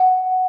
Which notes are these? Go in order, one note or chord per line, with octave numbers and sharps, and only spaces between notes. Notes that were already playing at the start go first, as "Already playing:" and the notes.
Already playing: F#5